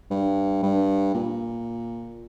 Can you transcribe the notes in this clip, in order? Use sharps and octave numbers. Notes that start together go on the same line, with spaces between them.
G2
G2
A#2